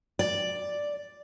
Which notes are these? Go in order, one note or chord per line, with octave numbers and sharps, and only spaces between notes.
D5